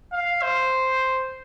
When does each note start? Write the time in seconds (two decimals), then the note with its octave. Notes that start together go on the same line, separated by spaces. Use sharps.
0.12 F5
0.42 C5